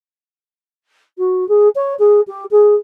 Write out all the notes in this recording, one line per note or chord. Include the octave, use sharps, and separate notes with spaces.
F#4
G#4
C#5
G#4
G4
G#4